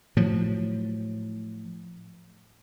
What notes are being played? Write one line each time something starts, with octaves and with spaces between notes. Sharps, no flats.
A2 F3 F#3